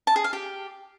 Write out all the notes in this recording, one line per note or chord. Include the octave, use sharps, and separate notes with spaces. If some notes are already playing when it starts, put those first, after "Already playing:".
A5
G#4
F5
G4